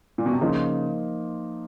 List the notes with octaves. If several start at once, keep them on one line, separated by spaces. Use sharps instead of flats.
A#2
B2
C3
C#3 F3 A#3 D#4